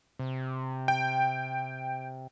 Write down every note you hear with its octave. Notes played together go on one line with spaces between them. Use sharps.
C3
G5